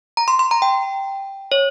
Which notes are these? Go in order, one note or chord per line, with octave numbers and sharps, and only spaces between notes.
A#5
C6
C6
A#5
G5
C#5